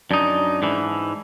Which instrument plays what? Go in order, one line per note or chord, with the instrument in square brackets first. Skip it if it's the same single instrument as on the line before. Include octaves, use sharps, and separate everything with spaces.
[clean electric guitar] F#2 D#4 [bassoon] D4
[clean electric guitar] G#2 E3